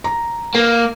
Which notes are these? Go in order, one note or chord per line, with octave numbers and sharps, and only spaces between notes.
A#5
A#3